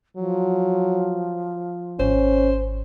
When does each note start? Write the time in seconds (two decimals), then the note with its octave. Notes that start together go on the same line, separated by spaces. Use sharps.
0.17 F3 F#3
2.00 G#1 C#4 C5